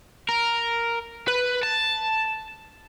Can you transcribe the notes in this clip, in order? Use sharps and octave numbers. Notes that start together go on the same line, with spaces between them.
A#4
B4
A5